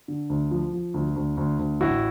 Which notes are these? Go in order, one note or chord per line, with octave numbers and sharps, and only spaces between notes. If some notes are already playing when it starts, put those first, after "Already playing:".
D3
D2
F3
F3
D2
D2
D2
D2
A1 E4 F#4